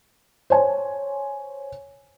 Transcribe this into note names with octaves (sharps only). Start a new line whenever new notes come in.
C5 C#5 G#5